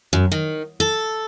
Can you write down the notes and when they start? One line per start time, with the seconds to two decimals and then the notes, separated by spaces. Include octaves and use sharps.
0.13 F#2
0.32 D#3
0.80 A4